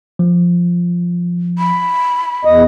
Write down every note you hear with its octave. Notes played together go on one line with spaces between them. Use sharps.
F3
B5
E2 D#5